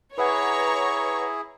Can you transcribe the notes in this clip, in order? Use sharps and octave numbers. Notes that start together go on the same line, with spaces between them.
E4 G#4 B4 C#5 F#5 A#5 C#6